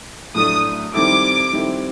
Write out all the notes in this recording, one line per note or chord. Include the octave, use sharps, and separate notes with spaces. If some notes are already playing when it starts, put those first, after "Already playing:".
A2 F#3 A3 D4 D#6
D#3 G3 C4 E4 A4 D6
D#3 G3 C4 E4 A4